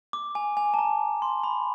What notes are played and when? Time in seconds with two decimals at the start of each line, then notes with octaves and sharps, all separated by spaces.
0.13 D6
0.35 G#5
0.57 G#5
0.74 A5
0.79 A#5
1.22 C6
1.44 B5